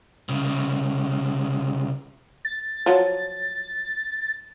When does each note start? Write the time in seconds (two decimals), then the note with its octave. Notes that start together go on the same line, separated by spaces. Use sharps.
0.29 C2 C#3
2.45 A6
2.86 F3 F#3